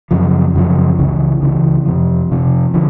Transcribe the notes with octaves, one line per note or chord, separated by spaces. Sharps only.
F#2 C#3 F3
F#2 C#3 F3
C#2 C#3 E3
C#2 C#3 E3
F2 C3 F3
F2 C3 F3
D3 F3